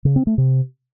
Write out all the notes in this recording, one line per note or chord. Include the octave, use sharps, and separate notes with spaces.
C#3
C4
A3
C3